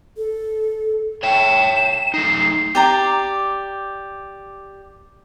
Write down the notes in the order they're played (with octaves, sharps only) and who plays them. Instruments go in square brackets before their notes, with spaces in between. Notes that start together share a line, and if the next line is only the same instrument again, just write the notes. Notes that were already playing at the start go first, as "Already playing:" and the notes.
[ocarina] A4
[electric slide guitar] C#5 E5 G5 [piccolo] E7
[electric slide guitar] A3 D#4 [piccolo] C7
[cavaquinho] G4 D5 A#5